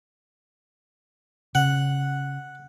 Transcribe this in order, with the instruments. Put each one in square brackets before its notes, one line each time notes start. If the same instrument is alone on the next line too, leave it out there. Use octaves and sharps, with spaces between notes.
[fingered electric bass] C#3 [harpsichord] F#5